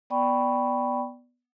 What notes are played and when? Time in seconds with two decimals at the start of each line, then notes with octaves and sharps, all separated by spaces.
0.10 B3 D5 G5 B5 C#6